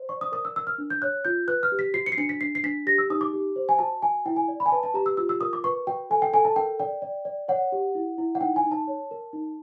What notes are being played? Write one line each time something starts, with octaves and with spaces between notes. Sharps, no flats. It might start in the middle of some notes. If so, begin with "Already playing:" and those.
Already playing: C5
D5 C#6
D#6
A#4 D#6
E6
A#4 E6
F6
D4
G6
C#5 F#6
F4 G6
B4 F#6
F6
G4
B6
F#4 C7
C#7
C7
D4 C#7
B6
D4 C7
C7
D4 B6
G4 A#6
E6
D#4 D#6
D6
G4
C5
G#5
F#4 A5
F#4 G#5
E4 G5
G#5
D5
B5
G#5
B4 A5
A5
G4 A#5
E6
F4 E6
E6
A#4 D#6
D6
B4 C#6
F#4 G5
A4 G#5
G5
A4 G#5
A5
A#4 G5
D5 G5
D5
D5
C#5 F#5
G4
E4
E4
F#5
D#4 G5
G#5
D#4
A5
C#5
A#4
D#4